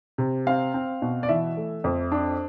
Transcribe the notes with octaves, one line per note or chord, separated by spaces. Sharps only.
C3
C4 F5
C4
B2
D5
E3 E5
A3
F2
D4